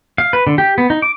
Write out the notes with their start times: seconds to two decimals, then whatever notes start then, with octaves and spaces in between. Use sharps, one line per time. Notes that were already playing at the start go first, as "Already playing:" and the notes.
0.18 F5
0.33 B4
0.47 D3
0.58 G4
0.78 B3
0.90 D#4
1.02 D6